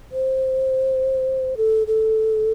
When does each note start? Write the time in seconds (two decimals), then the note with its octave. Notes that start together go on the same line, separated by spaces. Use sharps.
0.12 C5
1.57 A4
1.87 A4